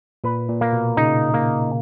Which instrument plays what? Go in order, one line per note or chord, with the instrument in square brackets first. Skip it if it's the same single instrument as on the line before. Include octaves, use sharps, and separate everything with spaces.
[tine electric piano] A#2 [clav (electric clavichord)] B4
[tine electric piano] A#2
[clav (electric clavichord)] A#3
[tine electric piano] B2
[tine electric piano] C#3 [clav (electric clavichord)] D#4
[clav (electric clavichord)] A#3